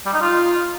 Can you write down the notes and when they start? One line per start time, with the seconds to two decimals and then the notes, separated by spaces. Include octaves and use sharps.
0.06 G3
0.14 D#4
0.22 F4